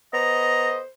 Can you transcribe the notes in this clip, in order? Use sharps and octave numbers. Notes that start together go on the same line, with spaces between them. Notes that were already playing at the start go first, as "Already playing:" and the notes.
B3 C5 D#5 A#5